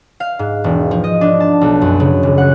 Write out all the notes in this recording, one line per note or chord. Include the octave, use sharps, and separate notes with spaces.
F5
G#2
E1
F3
D#5
D4
A5
B1
F#2
C#3
D#1
F#5